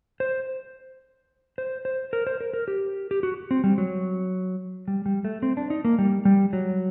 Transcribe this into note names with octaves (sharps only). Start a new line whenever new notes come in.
C5
C5
C5
A#4
C5
A#4
A#4
G4
G4
F#4
C4
G3
F#3
G3
G3
A3
C4
D4
D#4
A#3
G3
G3
F#3